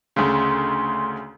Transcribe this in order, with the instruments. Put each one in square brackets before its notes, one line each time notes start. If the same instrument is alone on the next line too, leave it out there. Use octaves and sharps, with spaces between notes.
[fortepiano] D2 C#3 [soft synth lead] C6